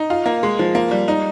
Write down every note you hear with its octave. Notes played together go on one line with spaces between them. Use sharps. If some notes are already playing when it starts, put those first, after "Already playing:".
Already playing: D#4
F4
A#3
G#3
F3
A#3
G3
D#4